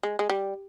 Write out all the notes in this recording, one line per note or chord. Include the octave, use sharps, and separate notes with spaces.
G#3
G#3
G3